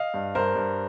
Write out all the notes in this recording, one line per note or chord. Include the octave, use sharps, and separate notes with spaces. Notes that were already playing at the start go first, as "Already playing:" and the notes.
Already playing: D#5 F5
G2
G2 A#4 C5
G2